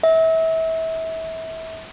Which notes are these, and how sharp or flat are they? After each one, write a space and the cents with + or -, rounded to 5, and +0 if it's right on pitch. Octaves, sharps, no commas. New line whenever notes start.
E5 -30